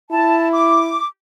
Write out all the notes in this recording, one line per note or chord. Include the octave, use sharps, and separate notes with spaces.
E4 A5
D6